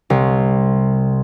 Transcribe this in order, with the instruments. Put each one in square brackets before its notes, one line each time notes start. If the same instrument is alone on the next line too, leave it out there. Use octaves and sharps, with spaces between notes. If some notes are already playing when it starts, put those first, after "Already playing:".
[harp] C2